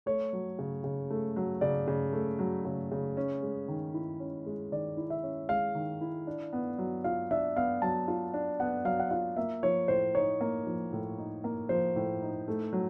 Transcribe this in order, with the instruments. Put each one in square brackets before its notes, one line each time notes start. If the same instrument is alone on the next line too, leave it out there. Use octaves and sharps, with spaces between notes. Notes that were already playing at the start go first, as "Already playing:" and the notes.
[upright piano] A3 [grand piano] C#5
[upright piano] F#3
C#3
C#3
A3
F#3
[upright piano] C#3 [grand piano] D5
[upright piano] C#3
A3
F#3
C#3
C#3
C#4
G#3
D#3
E4
C#4
G#3
[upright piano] D#3 [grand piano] D5
[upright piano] E4
[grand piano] E5
[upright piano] C#4
[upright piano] G#3 [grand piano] F5
[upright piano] D#3
E4
D4
B3
F#3
[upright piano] F4 [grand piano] F5
[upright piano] D4 [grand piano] E5
[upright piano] B3 [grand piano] F5
[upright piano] F#3 [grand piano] A5
[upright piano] F4
D4
[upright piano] B3 [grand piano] F#5
[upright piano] F#3 [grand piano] F5
[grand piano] F#5
[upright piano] F4 [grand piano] F5
[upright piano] A#3 [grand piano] E5
[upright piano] F3 [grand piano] C#5
[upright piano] A2 [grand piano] C5
[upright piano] D#4 [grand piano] C#5
[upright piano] A#3
F3
A2
D#4
A#3
[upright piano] F3 [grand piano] C5
[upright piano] A2
D#4
A3
F#3